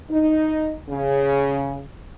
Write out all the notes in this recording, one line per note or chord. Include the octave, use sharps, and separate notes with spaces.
D#4
C#3